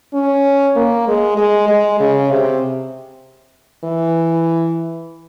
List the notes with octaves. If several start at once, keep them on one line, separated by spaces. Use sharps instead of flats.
C#4
A#3
G#3
G#3
G#3
C#3
C3
E3